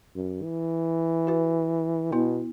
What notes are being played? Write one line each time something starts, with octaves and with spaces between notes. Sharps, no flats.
F#2
E3
F#4 B4
B2 B3 E4